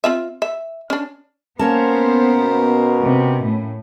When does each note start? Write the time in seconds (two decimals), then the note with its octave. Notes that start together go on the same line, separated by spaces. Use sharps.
0.04 C4 F4 E5
0.42 E5
0.90 C#4 D4
1.59 A#3 B3 C#4 A#4 C5 A5
2.32 B2
3.01 C3
3.43 A2